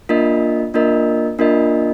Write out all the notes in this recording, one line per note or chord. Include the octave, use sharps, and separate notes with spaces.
A#3 D4 F4 A#4 D#5
A#3 D4 F4 A#4 D#5
A#3 D4 F4 A#4 D#5